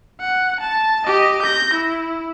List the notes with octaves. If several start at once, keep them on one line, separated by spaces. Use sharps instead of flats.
F#5
A5
G4 D#5
G6 A#6
E4